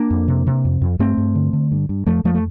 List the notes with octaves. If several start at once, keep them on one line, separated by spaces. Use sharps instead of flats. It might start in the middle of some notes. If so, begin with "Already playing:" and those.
Already playing: A#3 D4
F2
C3
C3
F2
F2
G2 A3 C4
G2
D3
D3
G2
G2
F2 F3 A3
F2 F3 A3
A3